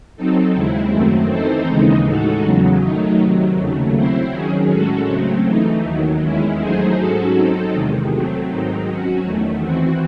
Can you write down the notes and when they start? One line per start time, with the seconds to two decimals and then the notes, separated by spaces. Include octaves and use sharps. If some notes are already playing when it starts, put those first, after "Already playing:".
0.16 F#3 C4 D#4 A4
0.54 D#2 C#3 G#3 C4 E4
0.92 F#2 D#3 F#3 A3 C4
1.30 E3 C4 D#4 A4 C5
1.67 D#2 C#3 E3 G#3 D#4
2.05 A2 G#3 D#4 F#4 A4
2.43 E2 C#3 F#3
2.81 D#3 F#3 A3 D#4
3.19 C3 D#3 F#3
3.56 D#2 C#3 F#3 A3
3.95 F#3 C4 E4 C5
4.32 D#3 F#3 C#4 G#4
4.70 A2 G#3 C#4 F#4 A4
5.08 C#3 F#3 A3 C4
5.46 E3 A3 D#4
5.84 D#2 D#3 F#3
6.22 E2 D#3 G#3 C#4 E4
6.59 F#3 A3 D#4 G#4 C5
6.97 G#2 F#3 C#4 F#4 A4
7.35 F#3 C4 D#4 A4
7.73 E2 C3 D#3 G#3
8.11 F#3 A3 C4
8.49 G#2 D#3 F#3 C4 D#4
8.86 F#3 C#4 F#4
9.25 E2 D#3 A3
9.63 E3 C4 F#4